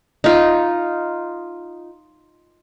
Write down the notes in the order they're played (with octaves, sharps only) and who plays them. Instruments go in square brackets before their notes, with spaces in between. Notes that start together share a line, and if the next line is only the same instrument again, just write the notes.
[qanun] D#4 F4